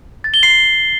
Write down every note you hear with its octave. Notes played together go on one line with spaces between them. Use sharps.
A6
G7
C7